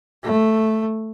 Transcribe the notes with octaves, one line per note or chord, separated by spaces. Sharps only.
A3